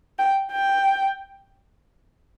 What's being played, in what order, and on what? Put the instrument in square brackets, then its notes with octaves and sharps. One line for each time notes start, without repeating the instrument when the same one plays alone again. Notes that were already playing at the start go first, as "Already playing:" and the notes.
[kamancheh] G5
G5